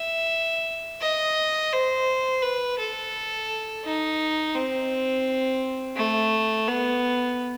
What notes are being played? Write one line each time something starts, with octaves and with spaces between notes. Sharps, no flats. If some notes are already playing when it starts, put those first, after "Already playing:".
Already playing: E5
D#5
C5
B4
A4
D#4
C4
A3
B3